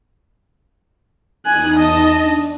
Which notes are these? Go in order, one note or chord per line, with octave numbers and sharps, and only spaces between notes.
E2 D#4 G#5 D#6 F#6
D#5 A5
D4